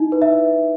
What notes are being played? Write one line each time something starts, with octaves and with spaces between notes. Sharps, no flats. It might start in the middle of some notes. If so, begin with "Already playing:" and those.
Already playing: D#4 E4
B4
E5